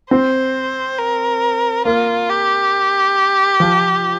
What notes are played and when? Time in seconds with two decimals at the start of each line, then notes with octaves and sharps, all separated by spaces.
0.11 C4 C5
0.99 A#4
1.85 A#3 F4
2.29 G4
3.60 F3